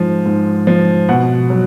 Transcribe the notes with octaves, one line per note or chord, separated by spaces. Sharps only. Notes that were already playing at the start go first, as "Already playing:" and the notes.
Already playing: G#2 F3
G#2
F3
B2 F#5
F#3